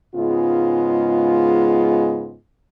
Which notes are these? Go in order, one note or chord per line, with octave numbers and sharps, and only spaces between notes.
G#2 C#3 G#3 B3 F4